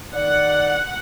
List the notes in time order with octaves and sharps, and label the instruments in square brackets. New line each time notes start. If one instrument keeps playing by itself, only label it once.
[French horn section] D#3 D5 [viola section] F#5